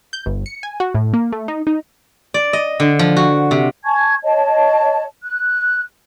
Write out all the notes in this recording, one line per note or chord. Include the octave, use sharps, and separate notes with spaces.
G6
G1
C#7
G#5
F#4
A2
A#3
A3
D#4
D#4
D5
D#5
D3
F3
F#4
C3
G#5 A5 C#6 G#6
C#5 D#5 A5
F#6